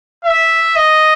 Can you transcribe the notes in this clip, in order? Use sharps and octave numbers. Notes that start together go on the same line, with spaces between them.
E5
D#5